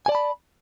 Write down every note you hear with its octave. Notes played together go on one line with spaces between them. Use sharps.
D5 G#5 A5 B5